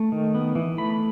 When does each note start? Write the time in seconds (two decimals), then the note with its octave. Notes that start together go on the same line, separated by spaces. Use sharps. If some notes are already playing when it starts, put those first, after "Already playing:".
Already playing: A3
0.12 D#3
0.35 B3
0.55 E3
0.78 A3 B5